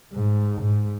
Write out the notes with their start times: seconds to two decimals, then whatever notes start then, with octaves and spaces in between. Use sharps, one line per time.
0.13 G#2
0.62 G#2